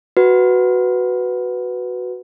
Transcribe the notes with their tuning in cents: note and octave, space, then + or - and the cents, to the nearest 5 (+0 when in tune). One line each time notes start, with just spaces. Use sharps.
F#4 +0 B4 +0